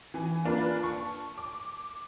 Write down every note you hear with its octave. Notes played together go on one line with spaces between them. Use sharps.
E3 G#5
A#3 D4 F4 B4
A5 C#6
D6